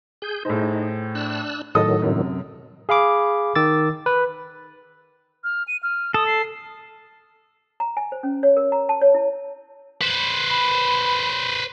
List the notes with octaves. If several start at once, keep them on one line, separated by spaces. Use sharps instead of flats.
G#4 G6
A2 D#4 G#4 C5
D4 E6 F#6
A2 D#3 F#3 A4 D#5 D#6
F#2 C3
G#4 F5 B5 D6
D#3 D6 E6 A6
B4
F6
D#7
F6
A4 D#6
C7
A#5
G#5
C5
C#4
C#5
A#4
A#5
A5
C#5
E4
B4 C5
B5